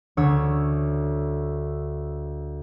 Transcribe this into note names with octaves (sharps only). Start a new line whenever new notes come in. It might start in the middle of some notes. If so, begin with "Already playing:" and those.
D2 C#5 E6